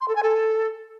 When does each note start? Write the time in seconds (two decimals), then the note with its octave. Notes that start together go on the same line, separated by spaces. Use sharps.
0.01 C6
0.08 A4
0.15 G#5
0.23 A4